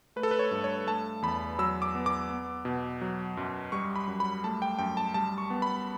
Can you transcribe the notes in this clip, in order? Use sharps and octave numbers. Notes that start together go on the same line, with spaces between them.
A3 B4
A4
B4
C#5
G2
C#5
A3 A5
E2 B5
F#3 E6
D6
B3
D6
B3
B2
F#3
F#2
G3 C#6
B5
F#2
B5
A3 A5
G5
F#2 G5
A5
G3 A5
C#6
B3
B5